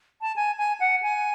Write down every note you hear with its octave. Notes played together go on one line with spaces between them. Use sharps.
A5
G#5
G#5
F#5
G#5